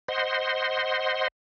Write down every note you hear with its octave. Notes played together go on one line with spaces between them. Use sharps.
C5 D#5 F#5 C6